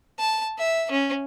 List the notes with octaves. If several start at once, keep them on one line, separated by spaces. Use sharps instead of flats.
A5
E5
C#4